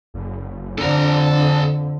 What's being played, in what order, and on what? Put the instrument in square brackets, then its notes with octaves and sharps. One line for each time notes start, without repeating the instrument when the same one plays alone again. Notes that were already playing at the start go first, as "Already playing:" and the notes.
[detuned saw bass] F#1
[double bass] F2 D3 [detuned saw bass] D4 [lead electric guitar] A4 A#5